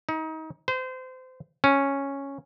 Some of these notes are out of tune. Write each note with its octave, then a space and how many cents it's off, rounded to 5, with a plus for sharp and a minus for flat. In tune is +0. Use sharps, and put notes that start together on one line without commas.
D#4 +30
C5 -30
C#4 -5